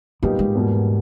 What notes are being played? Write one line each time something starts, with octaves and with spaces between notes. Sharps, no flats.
F#2 A#2 G3 B3 D#4 G4
G#2
E2 B2 G3 A#3